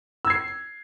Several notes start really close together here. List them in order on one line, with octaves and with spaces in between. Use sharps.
E6 G#6 C7